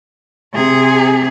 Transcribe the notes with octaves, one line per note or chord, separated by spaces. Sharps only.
C3 G#4